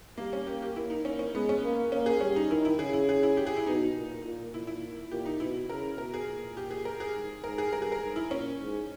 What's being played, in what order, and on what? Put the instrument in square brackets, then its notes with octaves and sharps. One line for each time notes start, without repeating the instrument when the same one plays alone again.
[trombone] G3 [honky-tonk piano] A#3
[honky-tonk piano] C#4
[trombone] A#3 [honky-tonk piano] G4
[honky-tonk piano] G4
[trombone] A#3 [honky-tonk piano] E4
[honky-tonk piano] D#4
[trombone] A#3 [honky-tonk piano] C#4
[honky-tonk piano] C#4
[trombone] G#3 [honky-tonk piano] B3
[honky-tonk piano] C#4
[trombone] A#3
[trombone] A#3 [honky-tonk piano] C#4
[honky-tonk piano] G#4
[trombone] G3 [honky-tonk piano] C#4
[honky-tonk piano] D#4
[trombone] D#3 [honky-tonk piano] E4
[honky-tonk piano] E4
[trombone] C#3 [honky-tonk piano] G#4
[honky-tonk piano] E4
G#4
E4
G4
G#4
E4
[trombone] B2 [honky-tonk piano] D#4
[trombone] A#2
A#2
[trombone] A#2 [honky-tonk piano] E4
[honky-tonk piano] E4
[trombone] A#2 [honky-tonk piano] G4
[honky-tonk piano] D#4
[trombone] B2 [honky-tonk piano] E4
[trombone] C#3 [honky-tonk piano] A#4
[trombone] B2 [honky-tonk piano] A#4
[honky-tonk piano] G#4
[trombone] A#2
[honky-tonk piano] G4
G#4
A#4
G#4
[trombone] G#2
[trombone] G#2 [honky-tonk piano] A#4
[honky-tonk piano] G#4
[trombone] G2 [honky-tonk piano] A#4
[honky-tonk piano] G#4
A#4
[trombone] G#2
[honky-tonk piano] E4
[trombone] A#2 [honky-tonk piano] C#4
[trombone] G#2